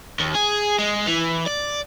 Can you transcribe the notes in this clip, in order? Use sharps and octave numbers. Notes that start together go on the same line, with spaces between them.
D#2
G#4
G#3
E3
D5